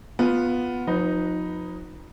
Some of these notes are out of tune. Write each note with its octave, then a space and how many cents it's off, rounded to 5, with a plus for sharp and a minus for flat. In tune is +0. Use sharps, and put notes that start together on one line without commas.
B3 +0 F4 +10
F3 +40 D#4 +0 B4 +0